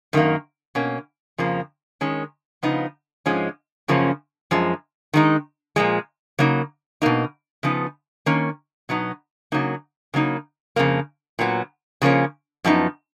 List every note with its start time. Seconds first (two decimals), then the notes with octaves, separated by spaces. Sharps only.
0.13 F#2 D#3 A#3
0.75 B2 A#3 C#4
1.38 F2 C#3 F3 A#3
2.01 D#3 G#3 C#4
2.63 C#3 F3 B3 D#4
3.26 G#2 F3 G#3 C#4
3.88 F#2 C#3 F3 A#3 C#4
4.51 F#2 F3 G#3
5.14 D#3 G#3 D#4
5.76 A#2 F3 G#3
6.39 C#3 F#3 A#3 D#4
7.02 B2 A#3 D#4
7.63 C#3 F3 B3 D#4
8.26 D#3 A#3 C#4
8.89 B2 F#3 B3 D#4
9.52 C#3 F#3 A#3 D#4
10.14 C#3 F#3 A#3 D#4
10.76 F2 C#3 F3 A#3
11.39 A#2 F#3 B3
12.02 C#3 F3 A#3 C#4
12.64 F#2 F3 B3 D#4